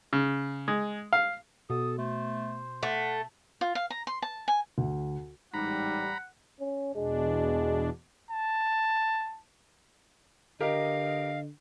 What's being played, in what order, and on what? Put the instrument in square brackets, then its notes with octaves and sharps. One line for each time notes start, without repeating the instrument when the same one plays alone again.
[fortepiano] C#3
G#3
F5
[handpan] B2 [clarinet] A4 [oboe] D#6
[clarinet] A3 [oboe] C5
[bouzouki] A3 [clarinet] F#5
[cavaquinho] F4
F5
A#5
C6
A5
G#5
[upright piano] D2
[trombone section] A1 G3 [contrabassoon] G#2 [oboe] F#5 [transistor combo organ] A#5 B5
[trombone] C#4
[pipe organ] E2 B2 D4 [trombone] G#3
[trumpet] A5
[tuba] D3 [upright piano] G4 A#4 [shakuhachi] D#5 [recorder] F5